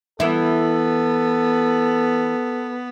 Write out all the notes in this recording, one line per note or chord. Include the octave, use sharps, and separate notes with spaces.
E3 B3 E4 A4